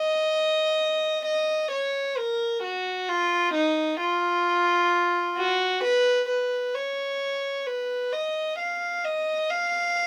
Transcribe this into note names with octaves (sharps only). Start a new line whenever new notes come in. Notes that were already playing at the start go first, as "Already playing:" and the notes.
Already playing: D#5
D#5
C#5
A#4
F#4
F4
D#4
F4
F#4
B4
B4
C#5
B4
D#5
F5
D#5
F5